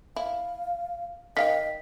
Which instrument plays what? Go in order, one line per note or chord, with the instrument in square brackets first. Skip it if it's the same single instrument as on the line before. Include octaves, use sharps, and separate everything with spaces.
[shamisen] E4 [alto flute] F5
[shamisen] D#3 F5 G5 [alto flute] D#5 [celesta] B6